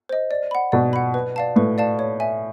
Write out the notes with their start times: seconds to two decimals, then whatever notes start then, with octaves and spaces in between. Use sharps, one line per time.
0.09 C5 D#5
0.31 D5
0.51 F#5 B5
0.72 B2 D5
0.93 F#5 B5
1.14 B4
1.36 D5 F5 A5
1.56 A2 B4
1.78 D5 F5 A5
1.99 C#5
2.20 E5 G#5